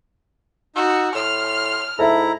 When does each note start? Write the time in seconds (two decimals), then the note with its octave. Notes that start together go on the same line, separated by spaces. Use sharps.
0.76 D#4 F#4 E6
1.15 A2 C6 F6
1.99 G#2 E4 A4 E5 A#5